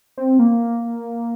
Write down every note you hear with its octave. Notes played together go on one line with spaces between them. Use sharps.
C4
A#3